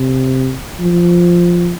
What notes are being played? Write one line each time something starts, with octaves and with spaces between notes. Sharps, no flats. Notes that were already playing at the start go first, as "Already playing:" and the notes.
Already playing: C3
F3